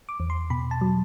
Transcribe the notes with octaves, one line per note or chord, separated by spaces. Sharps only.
D6
E2
C6
B2 B5
A5
F#3